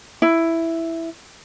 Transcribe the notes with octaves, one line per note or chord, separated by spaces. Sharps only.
E4